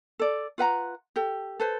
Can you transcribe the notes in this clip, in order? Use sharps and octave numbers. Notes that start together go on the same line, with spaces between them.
A4 D5
F4 B4 F#5 A#5
G4 A4
A4 B4 C5